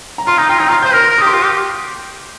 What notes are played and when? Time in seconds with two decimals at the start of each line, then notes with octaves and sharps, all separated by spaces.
0.18 A#5
0.27 F4 C6
0.38 D#4 A#5
0.49 F4 G5
0.60 D#4 A#5
0.69 F4 C6
0.83 C5 G6
0.94 A#4 F6
1.10 A#4
1.18 D#6
1.22 G4 C6
1.34 F4
1.44 G4